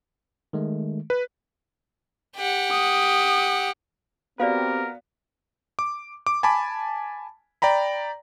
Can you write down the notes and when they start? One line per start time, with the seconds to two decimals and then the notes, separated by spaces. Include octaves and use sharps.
0.53 D#3 G#3 A3
1.10 B4
2.36 G4 F#5
2.71 D#6
4.40 B3 C4 F#4 G4 A#4 D5 F5
5.79 D6
6.26 D6
6.43 G#5 A5 B5 D6
7.62 D5 G5 A#5 B5